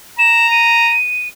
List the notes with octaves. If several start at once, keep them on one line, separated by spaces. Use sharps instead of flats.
A#5 E7
D#7